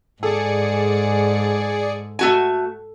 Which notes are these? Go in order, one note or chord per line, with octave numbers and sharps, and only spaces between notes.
G#2 G#4 A4 D5 C#7
A3 F#4 G#5